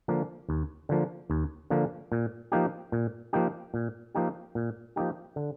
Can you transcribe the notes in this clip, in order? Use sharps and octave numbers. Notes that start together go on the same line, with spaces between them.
D3 F3 A#3
D#2
D3 F3 A#3
D#2
D3 F3 A#3
A#2
F3 A#3 D#4 G4
A#2
F3 A#3 D#4 G4
A#2
F3 A#3 D#4 G4
A#2
F3 A#3 D#4 G4
D3